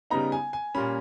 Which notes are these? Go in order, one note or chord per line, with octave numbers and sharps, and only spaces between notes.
C#3 G3 B3 D#4 A#5
G#5
G#5
A#2 G3 A#3 C#4 B5